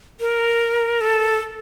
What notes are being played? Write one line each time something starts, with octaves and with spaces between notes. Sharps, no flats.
A#4
A4